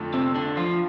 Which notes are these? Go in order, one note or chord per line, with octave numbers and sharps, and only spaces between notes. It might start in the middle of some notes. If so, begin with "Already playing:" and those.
Already playing: F2 D3 A3 F4
C3 C4
D3 D4
F3 F4